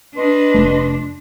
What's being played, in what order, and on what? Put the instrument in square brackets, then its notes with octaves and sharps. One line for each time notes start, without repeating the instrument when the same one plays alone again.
[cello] D4 [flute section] B4 D#5 C6
[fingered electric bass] F1 A3